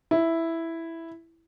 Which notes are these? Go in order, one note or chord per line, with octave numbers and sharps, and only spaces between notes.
E4